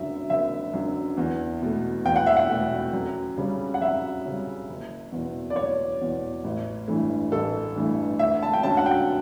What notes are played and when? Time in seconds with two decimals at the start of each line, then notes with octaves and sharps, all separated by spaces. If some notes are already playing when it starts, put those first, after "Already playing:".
Already playing: F#1 F#2 D3 E5
0.30 F#1 E5
0.74 F#2 D3
1.17 E2
1.62 B2 A3
2.05 E2 G5
2.16 F#5
2.27 E5
2.36 F#5
2.49 B2 A3
2.93 F#2
3.37 C#3 G3 C#4
3.74 F#5
3.81 F#2 E5
4.25 C#3 G3 C#4
4.69 F#1
5.12 E2 B2
5.50 D5
5.56 F#1 C#5
6.01 E2 B2
6.44 A1
6.88 G2 E3 A3
7.32 A1 A4
7.76 G2 E3 A3
8.19 D2 E5
8.42 A5
8.53 G5
8.63 D3 F#3 C#4 A5
8.77 F#5
8.86 G5